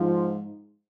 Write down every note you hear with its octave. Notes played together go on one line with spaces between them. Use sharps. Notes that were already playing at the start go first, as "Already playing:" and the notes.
Already playing: G#2 F3